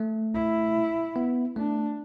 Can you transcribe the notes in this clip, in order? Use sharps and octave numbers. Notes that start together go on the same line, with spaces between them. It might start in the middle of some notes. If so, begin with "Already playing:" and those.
Already playing: A3
E4
B3
A3 D4